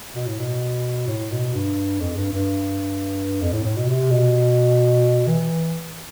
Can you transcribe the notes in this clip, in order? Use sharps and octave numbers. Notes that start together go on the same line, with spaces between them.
B2
A2
B2
A2
B2
G2
F2
G2
G2
F2
A2
A2
B2
C3
B2
E3